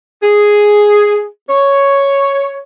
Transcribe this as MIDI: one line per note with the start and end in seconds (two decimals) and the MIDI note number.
0.22 1.26 68
1.49 2.60 73